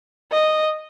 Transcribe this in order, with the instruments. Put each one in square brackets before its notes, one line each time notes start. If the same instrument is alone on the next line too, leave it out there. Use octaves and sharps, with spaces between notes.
[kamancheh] D#5